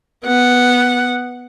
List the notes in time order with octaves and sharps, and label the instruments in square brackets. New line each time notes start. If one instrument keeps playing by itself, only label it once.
[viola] B3 F#5